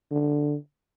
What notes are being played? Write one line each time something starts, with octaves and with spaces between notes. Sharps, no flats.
D3